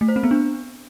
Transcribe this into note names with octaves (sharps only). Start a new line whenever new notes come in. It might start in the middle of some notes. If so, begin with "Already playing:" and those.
A3
C5
C4
B3
D4